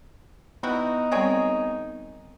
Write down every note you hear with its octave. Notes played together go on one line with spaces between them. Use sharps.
G3 B3 D#4 E4 F#4
D#3 G3 C4 G#4 C#5 D5